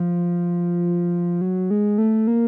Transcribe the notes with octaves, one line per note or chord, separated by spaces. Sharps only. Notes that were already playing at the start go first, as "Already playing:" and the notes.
Already playing: F3
F#3
G#3
A3
A#3